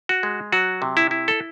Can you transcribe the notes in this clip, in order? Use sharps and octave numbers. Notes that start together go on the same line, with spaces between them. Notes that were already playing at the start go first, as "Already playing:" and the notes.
F#4
G#3
F#3 F#4
C3
E4
E4
A4